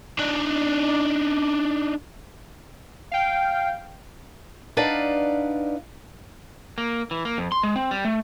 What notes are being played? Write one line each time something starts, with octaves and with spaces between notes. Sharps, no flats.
D4 D#4
F5 G5
D4 D#4 B4 D5 F5 F#5
A#3
E3
A#3
F2
C6
G#3
C4
G3
A3